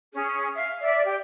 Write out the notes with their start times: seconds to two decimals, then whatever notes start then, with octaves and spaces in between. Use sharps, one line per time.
0.14 C#4 G#4
0.54 E5 F5
0.81 D5 E5
1.05 G4 G5